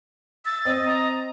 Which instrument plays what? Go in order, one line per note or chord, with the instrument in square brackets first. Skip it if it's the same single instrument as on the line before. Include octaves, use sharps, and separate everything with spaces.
[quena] E6 [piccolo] A6
[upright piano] C4 [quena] D#5
[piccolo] A#5